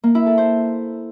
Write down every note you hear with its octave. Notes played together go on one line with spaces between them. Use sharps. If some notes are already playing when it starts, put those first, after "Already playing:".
A#3
E4
A4
C5